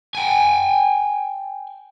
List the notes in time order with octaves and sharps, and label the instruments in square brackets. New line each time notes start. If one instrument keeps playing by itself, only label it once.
[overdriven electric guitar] G5 G#5